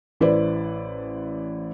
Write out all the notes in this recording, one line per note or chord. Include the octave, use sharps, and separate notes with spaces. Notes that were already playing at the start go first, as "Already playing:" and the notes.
A1 E4 B4 C5 D5